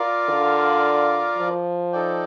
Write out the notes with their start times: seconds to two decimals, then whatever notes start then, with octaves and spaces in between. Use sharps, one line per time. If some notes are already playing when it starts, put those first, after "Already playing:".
Already playing: F4 A#4 D5 F5
0.29 D3
1.37 F3
1.93 D#4 A4 D5 G5